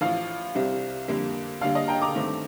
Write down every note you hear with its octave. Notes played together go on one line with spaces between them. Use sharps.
A1 A2 F3 F5
C2 C3 G3 C4
F2 D3 G3 A#3
D2 D3 G3 A#3 F5
D#5
G5 A#5
A#5 D6
G2 D#3 A3 C4